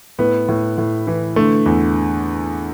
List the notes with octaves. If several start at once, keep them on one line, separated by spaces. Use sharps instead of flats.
A2 B3
A2
A2
E3
D3 A3
E2